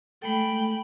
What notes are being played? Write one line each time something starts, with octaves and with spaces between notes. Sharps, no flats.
G#3 A3 A4 G5 B5